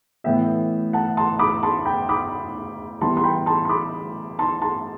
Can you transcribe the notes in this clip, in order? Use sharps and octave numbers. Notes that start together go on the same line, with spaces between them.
A2 E3 B3 E4 E5 G5
F#5 A5
A5 C6
B5 D6
A5 C6
G5 B5
B5 D6
E3 G3 B3 E4 A5 C6
C6
G5 B5
A5 C6
C6
B5 D6
A5 C6
A5 C6